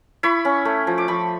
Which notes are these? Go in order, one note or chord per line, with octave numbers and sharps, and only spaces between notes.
E4 B5 C#6
C#4
A3
F3
D6
F3 B5 C#6